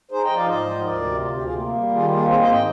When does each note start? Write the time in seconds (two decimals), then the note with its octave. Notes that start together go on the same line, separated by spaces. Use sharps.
0.11 D#4 G#4 C5
0.24 D#5 G5
0.30 F3
0.35 D5 F5
0.48 G#2 C5 D#5
0.65 F3
0.84 D2 A#4 D5
1.01 C3
1.19 D2 F4
1.32 C3 G4
1.43 F4 G#4
1.55 A#3
1.74 G3
1.91 D#3 F4 G#4
2.09 A#3 F4 G#4
2.27 C4 G#4 C5
2.39 C5 D#5
2.45 G#2
2.52 D#5 G5